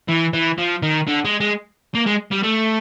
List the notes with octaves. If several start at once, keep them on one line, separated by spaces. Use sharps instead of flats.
E3
E3
F3
D#3
D3
G#3
G#3
A#3
G#3
G3
A3